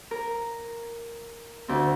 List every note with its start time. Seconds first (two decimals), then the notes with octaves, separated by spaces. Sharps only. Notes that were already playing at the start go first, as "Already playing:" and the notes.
0.11 A#4
1.68 D2 C4